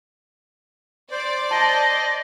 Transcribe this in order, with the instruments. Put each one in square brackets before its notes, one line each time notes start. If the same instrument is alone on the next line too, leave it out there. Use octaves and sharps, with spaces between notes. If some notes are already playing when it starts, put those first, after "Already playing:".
[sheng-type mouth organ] C5 [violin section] D5
[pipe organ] D#5 [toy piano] A5